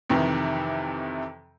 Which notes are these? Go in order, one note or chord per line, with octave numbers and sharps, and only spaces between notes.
F2 C3 D#3 E3